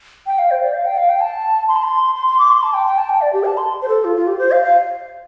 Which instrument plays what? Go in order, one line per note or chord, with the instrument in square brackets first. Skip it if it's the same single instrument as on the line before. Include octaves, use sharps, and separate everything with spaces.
[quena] G5
F5
C5
D5
F5
G5
F5
G5
A5
C6
A5
C6
C6
C6
D6
C6
A5
G5
G5
A5
G5
D5
G4
A5
C6
C5
A4
F4
F4
G4
C5
F5
F5